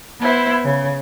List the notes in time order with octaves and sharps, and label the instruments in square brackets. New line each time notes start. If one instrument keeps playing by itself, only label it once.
[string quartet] B3 E4 C5
C#3